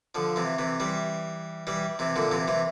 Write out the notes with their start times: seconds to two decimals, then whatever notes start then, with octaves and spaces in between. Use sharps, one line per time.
0.15 D3 F3
0.36 C3 E3
0.58 C3 E3
0.80 E3 G3
1.67 E3 G3
1.99 C3 E3
2.16 A#2 D3
2.31 C3 E3
2.48 C3 E3